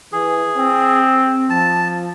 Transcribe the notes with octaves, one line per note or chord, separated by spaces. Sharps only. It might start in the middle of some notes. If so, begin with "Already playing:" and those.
E3 G#4
C4
F3 A5